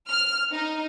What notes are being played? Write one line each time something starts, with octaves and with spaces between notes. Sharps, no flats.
F6
D#4